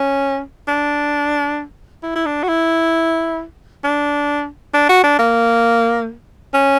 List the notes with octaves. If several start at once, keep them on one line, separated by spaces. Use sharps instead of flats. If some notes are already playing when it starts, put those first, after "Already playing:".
Already playing: C#4
D4
E4
E4
D4
F#4
E4
D4
D4
F#4
D4
A#3
C#4